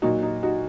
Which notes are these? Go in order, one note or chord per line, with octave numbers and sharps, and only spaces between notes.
A#2 F#3 D#4 F#4
D#4
D#4 F#4